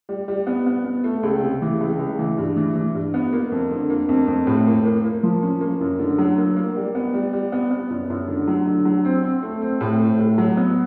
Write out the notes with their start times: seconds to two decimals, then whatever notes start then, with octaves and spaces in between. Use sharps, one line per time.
0.09 G3
0.28 G3
0.47 B3
0.66 B3
0.85 B3
1.04 A3
1.23 C#2
1.42 C3
1.62 E3
1.80 C#2
1.99 C#2
2.19 E3
2.38 G2
2.57 E3
2.75 E3
2.94 G2
3.14 B3
3.33 A#3
3.52 F2
3.71 D3
3.90 A#3
4.09 F2
4.28 F2
4.47 A2
4.67 A#3
4.85 A#3
5.05 A#3
5.23 F3
5.43 C#4
5.61 A#3
5.81 F#2
6.00 D3
6.18 F#3
6.38 A#3
6.57 A#3
6.76 G3
6.95 B3
7.14 G3
7.33 G3
7.52 B3
7.71 B3
7.91 F#2
8.10 F#2
8.28 D3
8.48 F#3
8.66 D3
8.85 F#3
9.05 C4
9.24 C4
9.43 A3
9.62 C4
9.81 A2
10.00 A3
10.19 A2
10.38 F#3
10.57 B3